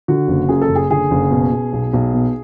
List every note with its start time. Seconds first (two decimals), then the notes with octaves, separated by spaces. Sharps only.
0.08 D3 F#4
0.28 F#1
0.49 F#2 G#4
0.61 A4
0.69 F#1
0.76 G#4
0.90 D3 G#4
1.11 F#1
1.31 B2
1.52 B2
1.73 B1
1.93 B1
2.13 B2